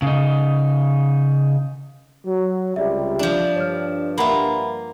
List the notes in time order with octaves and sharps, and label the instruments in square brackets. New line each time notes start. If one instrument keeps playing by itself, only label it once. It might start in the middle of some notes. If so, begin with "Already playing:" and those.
[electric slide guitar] C#3 D#4
[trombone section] F#3
[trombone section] C#2 C3 G3 [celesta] D5 E5
[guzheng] F3 D4
[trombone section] G2 [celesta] C#5 D5 F6
[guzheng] A#3 F4 [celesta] E5 F#5 B5